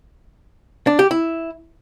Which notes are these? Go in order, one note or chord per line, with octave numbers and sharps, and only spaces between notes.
D4
G4
E4